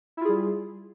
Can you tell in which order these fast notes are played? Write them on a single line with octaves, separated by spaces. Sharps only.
E4 F4 G#4 G3